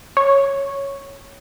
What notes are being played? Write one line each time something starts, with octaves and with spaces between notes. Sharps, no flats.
C#5